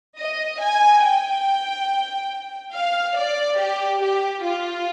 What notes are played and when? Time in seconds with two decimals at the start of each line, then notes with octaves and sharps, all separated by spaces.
0.18 D#5
0.60 G#5
1.03 G5
2.72 F5
3.15 D5
3.57 G4
4.00 G4
4.42 F4